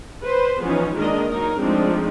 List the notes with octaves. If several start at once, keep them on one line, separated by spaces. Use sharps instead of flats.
B4 C5
E3 F3 B3 C#4 D#4
D#3 G#3 A#3 D4 A#4 D#5
F#3 D#4 A#4
F3 G#3 A3 C4 D4 D#4